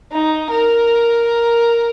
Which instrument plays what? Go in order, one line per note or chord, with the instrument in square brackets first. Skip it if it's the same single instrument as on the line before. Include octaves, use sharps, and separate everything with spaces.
[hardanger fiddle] D#4
A#4